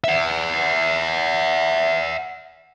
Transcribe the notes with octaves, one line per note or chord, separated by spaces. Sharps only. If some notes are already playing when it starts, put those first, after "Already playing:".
E5 F#5